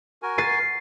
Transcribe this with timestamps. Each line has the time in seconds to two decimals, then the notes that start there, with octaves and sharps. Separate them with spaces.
0.22 F#4 A#4 G#5
0.38 A6 C7 D#7